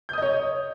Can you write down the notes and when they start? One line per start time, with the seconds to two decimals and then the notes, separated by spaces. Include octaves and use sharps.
0.09 G6
0.13 D#6
0.18 D#5
0.22 C#5